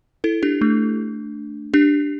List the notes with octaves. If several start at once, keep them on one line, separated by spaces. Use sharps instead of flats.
E4 A4
D4 G4
A3 D4
D4 G4